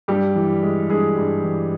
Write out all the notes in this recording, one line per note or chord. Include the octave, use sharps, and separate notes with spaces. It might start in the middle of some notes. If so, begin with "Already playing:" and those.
G2 G3 G4
E3
G#3
G2 G#3 G#4
G2
E3